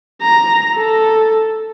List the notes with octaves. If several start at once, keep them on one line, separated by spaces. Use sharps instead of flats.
A#5
A4